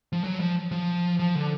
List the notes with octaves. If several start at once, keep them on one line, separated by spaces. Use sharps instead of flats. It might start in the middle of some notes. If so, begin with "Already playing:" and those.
F3
F#3
F3
F3
F3
D3